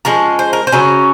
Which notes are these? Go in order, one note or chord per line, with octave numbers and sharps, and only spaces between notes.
F3 G#3 C#4 A#4
C5
A#4
C5
C#3 F#3 C#4